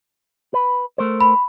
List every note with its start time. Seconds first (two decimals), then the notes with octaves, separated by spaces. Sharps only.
0.54 B4
0.98 A3 A#4 C5
1.21 B5